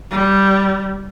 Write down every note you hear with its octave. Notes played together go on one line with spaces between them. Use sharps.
G3